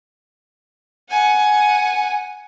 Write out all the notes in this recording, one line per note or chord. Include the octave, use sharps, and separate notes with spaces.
F#5 G#5